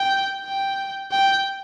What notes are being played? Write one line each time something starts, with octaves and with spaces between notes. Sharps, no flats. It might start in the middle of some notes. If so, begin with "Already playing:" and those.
Already playing: G5
G5
G5